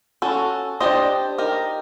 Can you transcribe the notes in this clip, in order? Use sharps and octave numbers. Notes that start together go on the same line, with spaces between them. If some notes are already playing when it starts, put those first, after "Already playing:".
C#4 F#4 A4
D4 G4 C5 D#5
D#4 G4 A#4